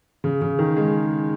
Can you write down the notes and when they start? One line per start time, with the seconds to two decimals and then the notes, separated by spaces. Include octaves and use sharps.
0.24 C#3
0.42 C#3
0.59 D#3
0.77 G#3